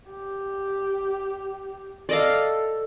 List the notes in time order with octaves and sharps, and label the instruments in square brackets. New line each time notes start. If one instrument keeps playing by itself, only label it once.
[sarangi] G4
[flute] A4 [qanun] D5 D#5 F5